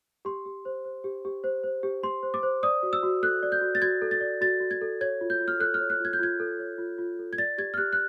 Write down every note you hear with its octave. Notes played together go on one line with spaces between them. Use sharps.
G4 C6
G4
C5
C5
G4
G4
C5
C5
G4
G4 C6
C5
D6
C5
D5 D#6
F#4
E6
F#4
A4 F#6
D5
G6
F#4
A6
F#4 G#6
A4
A6
D5
F#4 A6
F#4
G#6
A4
C#5 G#6
F4
G6
F4
F6
A4 F#6
F6
C#5
F#6
F4 G#6
G6
F4 G#6
A4
C#5
F4
F4
A4
G#6
D5 A6
G4 G#6
F6
G4 F#6
F#6